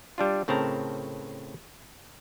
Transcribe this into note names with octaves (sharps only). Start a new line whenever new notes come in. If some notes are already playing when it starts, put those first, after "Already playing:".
G3 D4 F4
A2 C#3 C4 A#4 A5 A#5